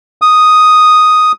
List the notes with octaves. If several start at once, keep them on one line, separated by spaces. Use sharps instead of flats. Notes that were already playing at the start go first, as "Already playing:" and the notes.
D#6